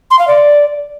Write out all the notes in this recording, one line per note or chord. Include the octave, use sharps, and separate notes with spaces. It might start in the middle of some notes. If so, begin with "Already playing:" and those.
C6
F5
D5